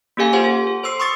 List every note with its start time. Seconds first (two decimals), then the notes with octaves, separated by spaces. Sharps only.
0.17 A#3 C#4 G4 A4 F5 G#5
0.33 F4 G4 C5 F#5 C6
0.44 A4
0.67 A4
0.83 C5 C6 E6 C7
1.00 C6 C#6 D#6 E6 A6 C#7